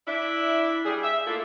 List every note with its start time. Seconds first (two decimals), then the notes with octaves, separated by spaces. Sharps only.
0.08 D4 E4 E5
0.85 G3 G#4
1.03 E5
1.27 A3 A#3 D4 E4 F4 A4